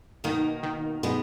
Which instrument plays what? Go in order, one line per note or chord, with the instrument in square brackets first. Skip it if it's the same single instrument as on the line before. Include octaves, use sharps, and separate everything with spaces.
[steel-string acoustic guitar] B2 A#3 D#4 [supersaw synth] D#3
[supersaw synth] D#3
[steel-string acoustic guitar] B2 G#3 B3 D#4